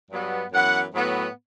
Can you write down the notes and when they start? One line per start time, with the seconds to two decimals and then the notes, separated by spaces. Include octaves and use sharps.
0.10 G2 F#3 B3
0.53 F#2 E3 B3 F#5
0.95 A2 F#3 B3